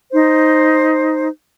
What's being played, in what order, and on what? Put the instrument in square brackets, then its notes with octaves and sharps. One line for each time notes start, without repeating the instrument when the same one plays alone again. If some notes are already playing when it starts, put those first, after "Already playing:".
[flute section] D#4 C5